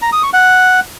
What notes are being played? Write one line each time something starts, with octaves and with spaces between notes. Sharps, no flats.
A#5
D#6
C#6
F#5